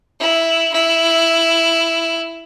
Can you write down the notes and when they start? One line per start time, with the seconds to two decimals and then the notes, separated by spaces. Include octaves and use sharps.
0.20 E4
0.73 E4